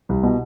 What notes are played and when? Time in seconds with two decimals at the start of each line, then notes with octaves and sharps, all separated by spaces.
0.09 C2
0.23 B2